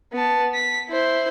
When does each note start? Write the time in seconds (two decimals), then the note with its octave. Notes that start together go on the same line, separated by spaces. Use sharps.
0.13 B3 A5
0.55 B6
0.89 E4 C5